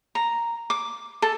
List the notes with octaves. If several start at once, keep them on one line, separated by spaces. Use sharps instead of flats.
A#5
D6
A4